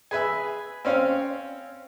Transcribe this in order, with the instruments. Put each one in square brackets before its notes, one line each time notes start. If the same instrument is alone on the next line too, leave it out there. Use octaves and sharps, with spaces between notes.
[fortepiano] G#4 B4 E5
C4 C#4 C#5 F5